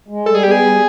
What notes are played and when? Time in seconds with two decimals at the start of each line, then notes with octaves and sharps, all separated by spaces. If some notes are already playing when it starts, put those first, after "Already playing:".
0.08 G#3
0.26 G3 A4
0.35 G#4
0.43 B3 G4
0.51 G#4
0.62 G3